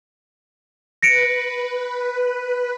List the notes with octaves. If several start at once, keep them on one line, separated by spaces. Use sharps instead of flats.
B4 A#6 C#7 D7